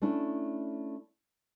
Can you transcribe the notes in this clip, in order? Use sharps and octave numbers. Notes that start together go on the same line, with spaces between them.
A3 C#4 D4 E4